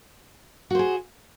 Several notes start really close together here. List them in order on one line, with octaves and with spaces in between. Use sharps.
F#4 C5 G#4